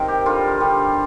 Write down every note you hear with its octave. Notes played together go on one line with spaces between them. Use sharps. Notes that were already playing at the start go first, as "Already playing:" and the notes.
Already playing: C3 D#3 A#4 C5
G4
D3 G3 F4
D3 G3